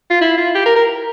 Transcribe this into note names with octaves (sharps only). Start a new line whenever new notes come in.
F4
E4
F4
G4
A#4
A#4